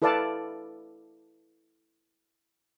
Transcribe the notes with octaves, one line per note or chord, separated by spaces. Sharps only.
E4 A4 B4 D5 F5 A5